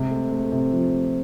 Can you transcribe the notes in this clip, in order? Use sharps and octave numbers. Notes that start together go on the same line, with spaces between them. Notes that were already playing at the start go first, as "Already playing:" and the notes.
Already playing: C3 G#3
A3
A3
C3
F3